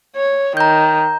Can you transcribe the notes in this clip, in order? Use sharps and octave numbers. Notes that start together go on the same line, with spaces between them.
C#5
D#3 A#5 G6